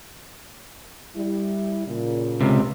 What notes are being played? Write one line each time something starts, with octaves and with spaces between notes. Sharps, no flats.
G3 E4
A#2 C#3
C#2 C3